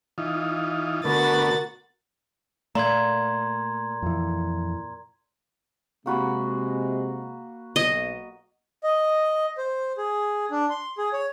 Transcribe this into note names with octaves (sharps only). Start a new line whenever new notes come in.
E3 D#4 F4
D3 A3 B3 F#4 A#4 A6
A#2 A3 A#5 C6 G#6
F2 E3
C3 G#3 A#3 F#4 B5
B1 D#5
D#5
C5
G#4
D4
C6
G#4
C#5